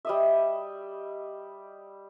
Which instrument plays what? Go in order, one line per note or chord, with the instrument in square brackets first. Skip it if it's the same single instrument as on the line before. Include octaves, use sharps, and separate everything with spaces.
[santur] G3 D#5 E5